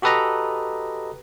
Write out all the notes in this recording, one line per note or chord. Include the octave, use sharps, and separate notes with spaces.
F#4 G4 A4 B4 D#5 A#5